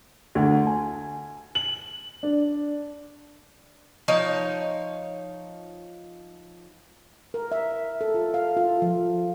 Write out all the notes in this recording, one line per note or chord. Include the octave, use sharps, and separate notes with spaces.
D2
G#5
F#7
D4
F3 D#4 C#5
A#4
E5
A4
F4
F5
F4
F3